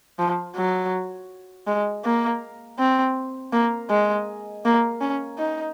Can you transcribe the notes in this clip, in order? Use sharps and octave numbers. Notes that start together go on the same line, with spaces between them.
F3
F#3
G#3
A#3
C4
A#3
G#3
A#3
C#4
D#4